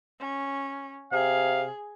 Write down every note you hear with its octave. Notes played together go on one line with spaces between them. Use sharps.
C#4
C3 G#4 F5